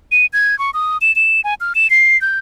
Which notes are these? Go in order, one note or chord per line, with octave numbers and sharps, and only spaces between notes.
D#7
G#6
C#6
D#6
E7
E7
G#5
F6
E7
C7
G6